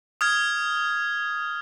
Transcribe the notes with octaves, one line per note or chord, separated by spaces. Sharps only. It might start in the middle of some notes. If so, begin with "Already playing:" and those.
D#6 F6 G#6